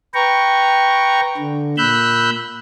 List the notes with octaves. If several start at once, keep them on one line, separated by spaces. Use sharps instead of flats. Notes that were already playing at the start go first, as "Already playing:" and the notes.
B4 G5 A#5 C#6
D3
A#2 B5 E6 F#6 G6